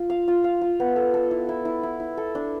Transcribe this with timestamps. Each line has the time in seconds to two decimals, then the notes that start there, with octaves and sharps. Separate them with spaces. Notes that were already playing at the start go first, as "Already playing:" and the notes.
Already playing: F4
0.10 F5
0.28 F4
0.44 F5
0.61 F4
0.80 B3
0.96 A4
1.14 A4
1.31 E4
1.49 E4
1.65 E4
1.83 E4
2.00 E4
2.17 A4
2.35 D4